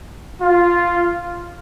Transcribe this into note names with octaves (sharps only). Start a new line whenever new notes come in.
F4